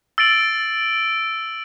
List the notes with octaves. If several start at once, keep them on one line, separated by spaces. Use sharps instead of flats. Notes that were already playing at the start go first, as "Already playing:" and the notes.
E6 A6 D7 F#7